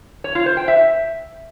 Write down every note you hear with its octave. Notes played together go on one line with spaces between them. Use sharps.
C#5
F4
C5
G5
E5